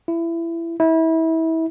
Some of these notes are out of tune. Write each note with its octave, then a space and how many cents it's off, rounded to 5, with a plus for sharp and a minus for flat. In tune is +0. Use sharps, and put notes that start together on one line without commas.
E4 +20
E4 -30